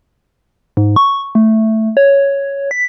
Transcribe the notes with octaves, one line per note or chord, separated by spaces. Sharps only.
G#2
C#6
A3
C#5
B6